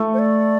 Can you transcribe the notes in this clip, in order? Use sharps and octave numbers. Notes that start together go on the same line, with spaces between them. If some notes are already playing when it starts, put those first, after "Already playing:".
Already playing: A3
C5
D5